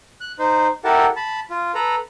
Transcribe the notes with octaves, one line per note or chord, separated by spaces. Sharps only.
F#6
D#4 C5
E4 G4 A4 A#4 F#5 A5
A5 B5
F4
A4 B4 A#5